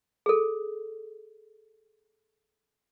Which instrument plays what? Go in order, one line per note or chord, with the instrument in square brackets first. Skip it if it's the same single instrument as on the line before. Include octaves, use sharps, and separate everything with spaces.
[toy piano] G#4 A4